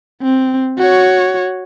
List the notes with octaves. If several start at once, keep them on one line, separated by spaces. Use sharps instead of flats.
C4
F#4 C#5